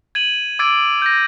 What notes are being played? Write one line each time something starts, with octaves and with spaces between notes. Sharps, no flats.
G#6 D#7 F#7
D6 E6 G#6 A6 D7
G6 A#6